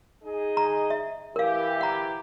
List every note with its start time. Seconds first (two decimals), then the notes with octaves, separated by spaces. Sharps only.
0.24 D#4 G#4 D#5
0.57 A#5
0.90 E5
1.36 E3 G4 A#4 F5
1.81 F#5 A#5